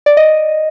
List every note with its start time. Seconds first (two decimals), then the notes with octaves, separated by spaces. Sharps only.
0.06 D5
0.17 D#5